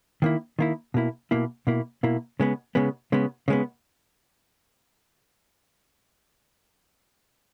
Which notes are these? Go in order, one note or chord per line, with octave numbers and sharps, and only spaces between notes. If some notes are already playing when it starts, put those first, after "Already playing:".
D#3 A#3 E4
D#3 A#3 E4
B2 A#3 E4
B2 A#3 E4
B2 A#3 E4
B2 A#3 E4
C#3 G#3 B3
C#3 G#3 B3
C#3 G#3 B3
C#3 G#3 B3